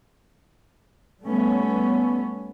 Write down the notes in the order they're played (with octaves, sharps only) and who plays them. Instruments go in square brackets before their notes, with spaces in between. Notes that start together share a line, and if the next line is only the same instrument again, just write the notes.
[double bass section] G3 A3 B3 C#4